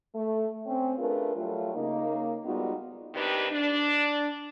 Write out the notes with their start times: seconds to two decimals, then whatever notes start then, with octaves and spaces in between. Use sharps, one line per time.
0.15 A3
0.66 C4 C#4
0.99 A3 D4 F4 G#4 A#4 B4
1.35 F#3 G3 A3 F4
1.75 C#3 A#3 D#4
2.45 G3 G#3 B3 D#4 F4 F#4
3.15 C3 D#3 D4 D#4 G4 B4
3.52 D4